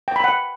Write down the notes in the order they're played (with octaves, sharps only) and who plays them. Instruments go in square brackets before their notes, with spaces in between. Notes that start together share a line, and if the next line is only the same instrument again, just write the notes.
[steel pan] G5
B5
F#5